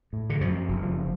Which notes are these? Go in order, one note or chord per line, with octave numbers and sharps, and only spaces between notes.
A2
D3
F#2 F3
F#1
F3